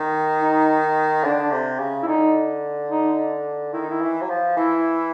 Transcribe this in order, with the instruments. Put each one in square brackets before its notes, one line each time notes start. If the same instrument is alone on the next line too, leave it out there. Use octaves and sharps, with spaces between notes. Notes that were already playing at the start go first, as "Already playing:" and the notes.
Already playing: [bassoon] D#3
[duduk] D#4
[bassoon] D3 [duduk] D4
[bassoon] C3
C#3
[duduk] E4
[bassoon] D3 [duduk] D#4
[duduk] D#4
[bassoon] D#3 [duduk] E4
[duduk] D#4
E4
[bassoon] E3
F#3
F3
[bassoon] E3 [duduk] E4